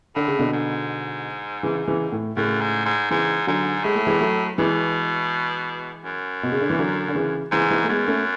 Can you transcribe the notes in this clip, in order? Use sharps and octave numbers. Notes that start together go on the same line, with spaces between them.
A2 D3
C#3
B2 D3
G#2
C#3 E3
C#3 E3
A2
F#2 A2 C#3
G#2
G#2
G#2 C#3 E3
G#2 D3 F#3
A2 G#3
A3
E3 G#3
F#3 A3
B2 E3 G#3
F#2
B2
C#3
D3
E3
D3 F#3
D3
C#3 E3
G#2 C#3 E3
E3 G#3
A3
F#2 G#3 B3
A3 C#4